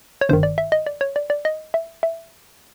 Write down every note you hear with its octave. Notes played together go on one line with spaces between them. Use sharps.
C#5
G1 G2 D#3 C5
D5
E5
D#5
D5
C#5
D5
D5
D#5
E5
E5